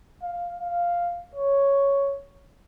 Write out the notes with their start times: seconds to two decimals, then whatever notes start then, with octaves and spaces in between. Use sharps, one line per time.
0.22 F5
0.60 F5
1.35 C#5